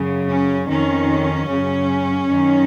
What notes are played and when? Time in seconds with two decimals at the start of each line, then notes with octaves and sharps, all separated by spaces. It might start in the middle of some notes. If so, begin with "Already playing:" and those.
Already playing: F#2 C#3
0.29 C#4
0.69 F2 D#3 C#4
1.49 F#2 C#3
2.29 F#2 D#3